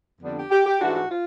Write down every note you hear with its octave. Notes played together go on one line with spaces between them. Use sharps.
F2 D3 G3 B3 D4
G4
G4
G4
G#2 E3 A3 D4 F#4
F#4
F4